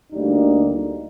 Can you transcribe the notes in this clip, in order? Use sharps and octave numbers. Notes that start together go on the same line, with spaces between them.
D2 D3 G3 A#3 D#4